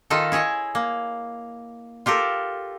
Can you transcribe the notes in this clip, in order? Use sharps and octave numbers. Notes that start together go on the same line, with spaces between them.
D#3 D#4 F4 A4
E4 G#4 C#5 D#5
A#3
F4 G4 A4 A#4